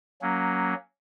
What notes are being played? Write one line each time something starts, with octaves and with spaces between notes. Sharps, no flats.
F#3 A#3 C#4